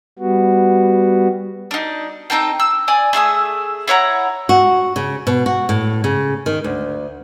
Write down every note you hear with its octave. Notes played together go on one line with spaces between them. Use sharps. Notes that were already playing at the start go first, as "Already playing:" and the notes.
G3 B3 F#4
D4 D#4
C4 D#4 A4 G5
E6
D5 G#5 D#6
A3 G#4 E5 D#6
E4 C#5 F#5 A#5
F#4
C#3
B2
F#4
A2
C#3
D#3
D2